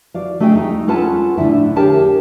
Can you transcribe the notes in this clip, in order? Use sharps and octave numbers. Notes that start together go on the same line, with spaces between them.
F#4 D5 F5
A3 F#4 G#4 D#5 G5
D#4
C#4 F4 A4 B4 F#5 A5
A2 D3 D4 E4
G4 G#4 A#4 C#5 G5 A5